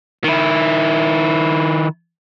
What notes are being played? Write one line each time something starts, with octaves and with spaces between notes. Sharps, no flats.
D#3 E4